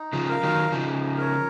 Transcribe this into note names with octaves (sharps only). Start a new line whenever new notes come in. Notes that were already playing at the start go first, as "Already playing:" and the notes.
Already playing: D#4
C#3 F3
A#4 F5
D#3 F#3
C#3 F3 D#4
A#4 C#5